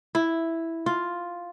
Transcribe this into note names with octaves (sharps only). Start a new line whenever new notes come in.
E4
F4